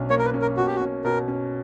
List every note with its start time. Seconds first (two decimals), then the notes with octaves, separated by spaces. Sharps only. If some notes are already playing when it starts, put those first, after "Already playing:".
Already playing: B1 C#4 D4
0.10 A#3 C#5
0.19 A#4
0.25 B4
0.34 C#4
0.42 A#4
0.57 B2 F#4
0.67 G4
0.76 F#4
0.81 C#4
1.04 B2 A#4
1.28 C#4